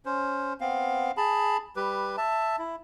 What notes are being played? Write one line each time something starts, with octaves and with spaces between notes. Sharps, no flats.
C#4 C5
B3 C4 F5
G#4 A5 B5
G3 G4 B4
E5 A5
E4